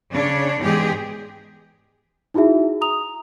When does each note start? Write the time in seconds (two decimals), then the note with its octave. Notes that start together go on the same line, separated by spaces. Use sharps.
0.10 C#3 D4 C#5
0.60 G#2 B2 E3 G#3 G4 G#4
2.34 D#4 E4 F#4 G#4 E5
2.81 A#5 D#6 F7